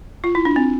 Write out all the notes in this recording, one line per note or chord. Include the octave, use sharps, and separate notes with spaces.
F4
E4
D4
C4